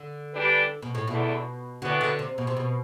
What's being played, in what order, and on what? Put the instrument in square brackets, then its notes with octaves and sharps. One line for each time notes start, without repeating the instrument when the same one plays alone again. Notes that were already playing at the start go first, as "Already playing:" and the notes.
Already playing: [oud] D3
[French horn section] E3 G3 D4 G4 B4
[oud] B2
A2
[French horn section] E2 D3 A3 E4 [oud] B2
[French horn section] A2 E3 B3 D4 F#4 [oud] D3
[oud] D3
C3
B2
C3
B2